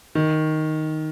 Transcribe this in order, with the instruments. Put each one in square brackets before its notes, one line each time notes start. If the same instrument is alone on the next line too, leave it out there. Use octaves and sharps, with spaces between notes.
[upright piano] D#3